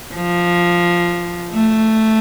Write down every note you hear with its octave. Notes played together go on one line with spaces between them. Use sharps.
F3
A3